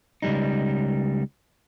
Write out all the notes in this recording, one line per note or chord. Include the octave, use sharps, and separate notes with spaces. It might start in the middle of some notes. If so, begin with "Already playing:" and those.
C#2 F#2 G3 D#4